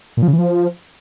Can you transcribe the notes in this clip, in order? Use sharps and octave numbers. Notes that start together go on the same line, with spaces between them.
A#2
F3
C#3
E3
F3